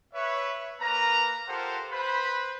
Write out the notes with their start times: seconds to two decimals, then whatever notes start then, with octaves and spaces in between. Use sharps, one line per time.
0.14 B4 C#5 E5
0.80 A#3 A#4 B4 A#5
1.48 F4 G4 A4 A#4 C5 F#5
1.91 B4 C5 B5